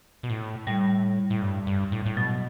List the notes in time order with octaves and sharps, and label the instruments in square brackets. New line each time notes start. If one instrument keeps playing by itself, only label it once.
[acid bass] B2
A2
[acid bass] A2 [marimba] G3
[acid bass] A2
G2
G2
A2
A2
[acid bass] B2 [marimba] F#3